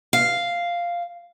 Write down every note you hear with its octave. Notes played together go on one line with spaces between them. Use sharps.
F5